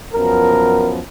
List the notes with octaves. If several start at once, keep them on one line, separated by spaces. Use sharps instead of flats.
F#2 F3 B3 A#4